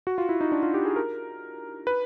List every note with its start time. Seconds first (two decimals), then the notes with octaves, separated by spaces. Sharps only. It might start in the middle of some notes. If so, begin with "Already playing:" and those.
0.07 F#4
0.18 F4
0.29 E4
0.41 D#4
0.52 D4
0.63 F4
0.74 G4
0.85 G#4
0.96 A#4
1.87 B4